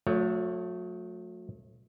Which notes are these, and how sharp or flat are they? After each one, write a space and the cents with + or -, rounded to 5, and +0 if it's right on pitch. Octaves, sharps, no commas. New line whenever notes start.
F#3 -40 A3 +10 C#5 +25